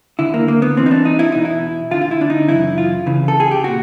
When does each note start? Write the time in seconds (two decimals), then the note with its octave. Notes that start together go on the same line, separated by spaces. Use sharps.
0.19 D#2 D3 E4
0.34 A#3
0.48 A#3
0.62 B3
0.76 C2 C3 E3 C4
0.86 D#4
0.91 D4
1.05 D#4
1.19 E4
1.32 E2 B2 D#4
1.45 E4
1.91 D2 D3 F4
2.01 F4
2.11 E4
2.21 D4
2.30 D#4
2.48 F#2 C#3 E3 E4
2.78 F4
3.06 C#2 C#3 E3
3.28 A4
3.40 G#4
3.51 G4
3.64 A#2 F#4